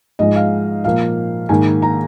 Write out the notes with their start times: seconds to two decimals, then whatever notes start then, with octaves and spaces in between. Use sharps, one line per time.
0.19 G#2 F3 G#3 D#5
0.36 F5
0.84 A#2 F3 A#3 F5
1.49 G#2 D#3 A#3 G#5
1.82 A#5